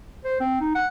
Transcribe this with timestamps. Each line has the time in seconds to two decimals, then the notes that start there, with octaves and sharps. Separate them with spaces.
0.25 C5
0.40 C4
0.61 D#4
0.75 F#5